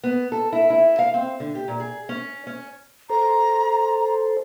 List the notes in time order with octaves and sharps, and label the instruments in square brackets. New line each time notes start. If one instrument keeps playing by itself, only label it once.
[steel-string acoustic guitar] B3
A4
E4
E4
F5
C4
D3
G4
A#2
G#4
C#4
C#4
[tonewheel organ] A4 C5 [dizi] A#5